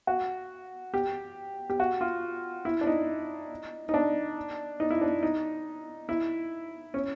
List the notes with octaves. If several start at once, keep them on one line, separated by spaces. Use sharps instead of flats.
F#4
G4
G4
F#4
F4
E4
D4
D#4
D#4
D4
D#4
E4
D4
D#4
E4
C#4